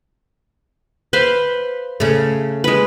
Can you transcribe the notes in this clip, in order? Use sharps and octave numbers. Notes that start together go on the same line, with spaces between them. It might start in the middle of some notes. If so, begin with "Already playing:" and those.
B4 C5 F5
C#3 A3
G#3 B4